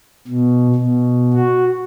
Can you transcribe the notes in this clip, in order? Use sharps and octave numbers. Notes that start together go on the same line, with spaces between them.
B2
B2
F#4